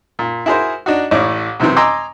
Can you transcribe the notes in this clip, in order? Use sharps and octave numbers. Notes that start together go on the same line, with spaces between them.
A#2
E4 F#4 G#4 A#4 C5
D4 D#4 F#4
A1 A2 D5
F#2 C3 D#3 E3 C4
D#5 G#5 A#5 C6 D6 E6